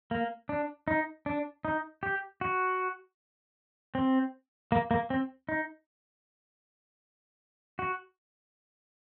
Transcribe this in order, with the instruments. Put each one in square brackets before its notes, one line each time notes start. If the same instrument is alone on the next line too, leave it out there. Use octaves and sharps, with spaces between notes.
[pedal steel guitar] A#3
D4
D#4
D4
D#4
G4
F#4
C4
A#3
A#3
C4
D#4
F#4